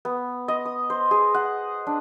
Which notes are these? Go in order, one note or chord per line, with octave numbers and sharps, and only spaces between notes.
B3
D#5
D#6
C5
G#4
F#5
D4